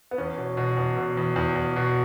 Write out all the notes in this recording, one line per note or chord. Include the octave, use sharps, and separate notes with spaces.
B3
E2 C#4
B2
B2
E2
B2
E2
E2
E2
B2